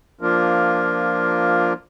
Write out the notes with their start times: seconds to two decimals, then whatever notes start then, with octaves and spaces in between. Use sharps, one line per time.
0.21 F3 A#3 D4 F4 A#4